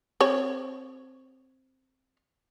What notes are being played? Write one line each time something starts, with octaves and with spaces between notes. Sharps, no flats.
C4 C#5